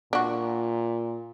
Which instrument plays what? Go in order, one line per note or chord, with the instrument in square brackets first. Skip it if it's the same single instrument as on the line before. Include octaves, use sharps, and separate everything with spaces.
[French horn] A#2 [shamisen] D4 F#4